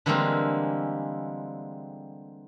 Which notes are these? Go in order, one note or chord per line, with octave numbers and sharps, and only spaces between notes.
D3 E3 G3 G#3 A#3 C4